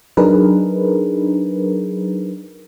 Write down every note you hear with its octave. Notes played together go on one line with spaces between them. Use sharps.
F#3 D4 D#4 G#4 A#4 B4